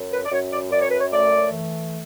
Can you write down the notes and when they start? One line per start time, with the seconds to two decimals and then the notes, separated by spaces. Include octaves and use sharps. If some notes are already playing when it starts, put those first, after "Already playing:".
Already playing: F#2
0.12 B4
0.25 D5
0.32 F#2 C#5
0.52 D5
0.71 F#2 D5
0.81 C#5
0.90 B4
0.99 C#5
1.12 A3 D5
1.51 E3